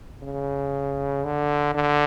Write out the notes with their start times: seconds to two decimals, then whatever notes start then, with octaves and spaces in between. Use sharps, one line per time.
0.22 C#3
1.24 D3
1.75 D3